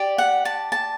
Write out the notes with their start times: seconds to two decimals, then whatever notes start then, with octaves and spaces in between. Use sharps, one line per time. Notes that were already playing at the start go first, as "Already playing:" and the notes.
Already playing: G4 D5
0.18 F#5
0.45 A5
0.72 A5